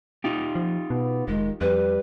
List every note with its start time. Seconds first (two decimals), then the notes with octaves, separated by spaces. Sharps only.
0.24 D#4 F4 G4
0.55 F3
0.90 B2 B3
1.28 F1 D#3 G#3
1.61 F2 G3 B4